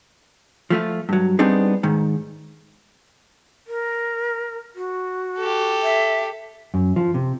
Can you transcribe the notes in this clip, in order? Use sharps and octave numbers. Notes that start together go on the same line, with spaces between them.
F3 A3 F4
G2 F#3
G3 B3 C4 D4 D#4 G#4
G#2 D#3
A#4
F#4
G4 A4
E5
F#2
F3
C3